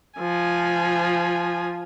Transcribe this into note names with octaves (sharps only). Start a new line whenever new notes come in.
F3 G#5